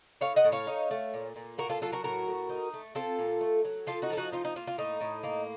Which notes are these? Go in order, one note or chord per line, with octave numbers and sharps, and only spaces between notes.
A2 C#5 F5
D#5 F#5
A2
C#5 F5
D#4
A3
A#2
A#2
A#3 F#4 A#4
F4 A4
F#3 F4 A4
F#4 A#4
A2 F#4 A#4
A2
D#4
A3
C4 F4 A4
A#2
A3
F#3
F3 F4 A4
D#4 F#4
F3 A4
D#4 F#4
D#4 F4
D#4
A#3 F4
F4
A2 D#4
A2
A#3